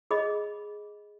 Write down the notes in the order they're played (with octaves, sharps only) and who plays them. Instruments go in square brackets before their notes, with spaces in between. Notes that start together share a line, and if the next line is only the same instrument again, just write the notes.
[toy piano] G#4 D#5 B5